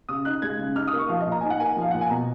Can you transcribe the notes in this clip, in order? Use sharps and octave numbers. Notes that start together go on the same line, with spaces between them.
C#3 D#6
D#4 F#6
G#3 G#6
C#3
D#4 F6
D#6
A#3
C#6
F3 F5
D#5
A#2
A#5
D#4 G#5
F#5
A#3 G#5
F3
F5
A#2 F#5
G#5
B2 A#5